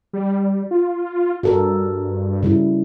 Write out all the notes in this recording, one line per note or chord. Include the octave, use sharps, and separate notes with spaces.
G3
F4
G2 F#4 A4 A#4
C#3 G3 E4